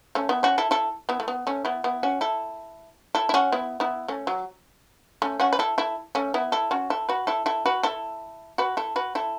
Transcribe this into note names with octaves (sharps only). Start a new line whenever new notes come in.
A3 C#4
B3 E4
C#4 F#4
E4 A4
E4 A4
B3 E4
A3
B3
A3 C#4
B3 E4
B3 E4
C#4 F#4
E4 A4
E4 A4
E4
C#4 F#4
B3 E4
B3 E4
A3 C#4
F#3
A3 C#4
C#4 F#4
B4
E4 A4
E4 A4
A3 C#4
B3 E4
E4 A4
C#4 F#4
E4 A4
F#4 B4
E4 A4
E4 A4
F#4 B4
E4 A4
F#4 B4
E4 A4
F#4 B4
E4 A4